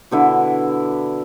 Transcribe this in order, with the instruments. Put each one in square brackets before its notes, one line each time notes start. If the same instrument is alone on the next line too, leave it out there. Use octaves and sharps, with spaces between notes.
[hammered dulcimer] B2 D3 E4